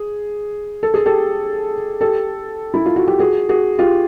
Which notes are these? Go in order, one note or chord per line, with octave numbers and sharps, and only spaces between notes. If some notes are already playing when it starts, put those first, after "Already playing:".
Already playing: G#4
A4
G#4
G4 A4
G4 A4
E4
F4
F#4
G4
F#4 G#4
F#4 G#4
F4 G4